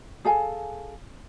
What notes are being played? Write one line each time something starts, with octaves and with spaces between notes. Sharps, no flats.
G#4 A4 F5 G#5